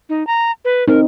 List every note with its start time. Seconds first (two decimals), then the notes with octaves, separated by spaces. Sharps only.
0.09 D#4
0.27 A#5
0.65 B4
0.88 C4 D#4 A#4